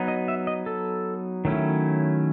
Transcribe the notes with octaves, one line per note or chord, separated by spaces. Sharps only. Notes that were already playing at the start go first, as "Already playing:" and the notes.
Already playing: F#3 B3 D#4
D#5
E5
D#5
A4
D#3 F#3 A3 C#4 E4